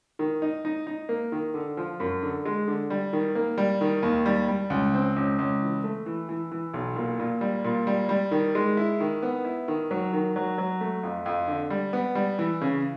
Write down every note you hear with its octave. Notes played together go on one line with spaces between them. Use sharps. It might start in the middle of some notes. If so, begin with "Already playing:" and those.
D#3
D#4
D#4
D#4
A#3
D#3
D3
F3
F#2
D3
G#3
D3
G3
D#3
A#3
G3
D#3
D#2
G3
G3
C#2
C4
C#2
C#2
E3
A3
E3
E3
E3
B1
A#2
A#2
G3
A#2
G3
G3
D#3
G#3
E4
D#3
B3
E4
D#3
F#3
D#3
F#3
F#3
A3
F2
F2
D3
G3
B3
G3
E3
C#3